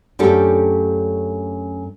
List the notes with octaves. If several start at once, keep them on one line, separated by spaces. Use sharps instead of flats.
F#2 A3 C#4 D4 G4 A4